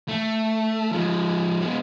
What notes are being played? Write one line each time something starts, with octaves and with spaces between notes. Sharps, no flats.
A3
F3 G#3
G#3 B3